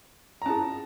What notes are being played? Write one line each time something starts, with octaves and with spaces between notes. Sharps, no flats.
A#5
C#4 E4 G#4 A5